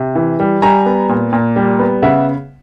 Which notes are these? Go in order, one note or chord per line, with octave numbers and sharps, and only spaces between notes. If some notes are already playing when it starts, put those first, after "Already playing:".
Already playing: C3
E3
G3
G3 G#5 A#5
B3
A#2
A#2
G3
B3
C#3 E5 F#5